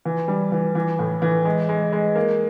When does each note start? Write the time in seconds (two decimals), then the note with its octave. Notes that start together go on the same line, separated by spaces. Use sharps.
0.05 E3
0.28 G3
0.52 E3
0.75 E3
0.99 A2
1.22 E3
1.45 G#3
1.69 G#3
1.92 G#3
2.16 A#3